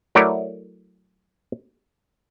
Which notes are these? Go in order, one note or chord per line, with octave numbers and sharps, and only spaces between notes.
F#3 A3 E4 A#4 C#5 D5